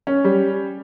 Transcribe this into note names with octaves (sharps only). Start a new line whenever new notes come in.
C#4
G3